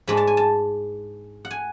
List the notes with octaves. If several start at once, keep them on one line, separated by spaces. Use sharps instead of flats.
G#2 G#3 D4 B5
A5
G#5
A5
F#5
G#5